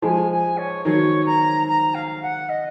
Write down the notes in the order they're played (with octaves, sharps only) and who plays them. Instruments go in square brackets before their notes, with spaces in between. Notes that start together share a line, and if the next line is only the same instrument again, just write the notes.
[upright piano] F3 G#3 [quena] G#5
[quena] G#5
C#5
[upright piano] D#3 F#3 [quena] C#5
[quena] A#5
A#5
F5
F#5
D#5